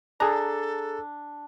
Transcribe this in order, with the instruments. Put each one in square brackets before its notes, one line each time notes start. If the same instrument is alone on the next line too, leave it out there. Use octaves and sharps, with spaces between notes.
[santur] D4 [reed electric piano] G#4 A#5 [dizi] A4